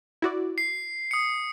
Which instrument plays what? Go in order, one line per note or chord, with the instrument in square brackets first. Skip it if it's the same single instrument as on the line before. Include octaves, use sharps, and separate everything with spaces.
[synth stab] E4 F#4 D5
[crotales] C7
D#6 C#7